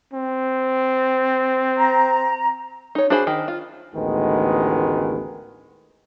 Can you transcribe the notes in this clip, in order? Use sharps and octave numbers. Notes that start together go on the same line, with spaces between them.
C4
A#5
D#4 C#5
D4 F#4 G#4 C5 B5
D#3
F4
A1 D2 D#3 G#3 B3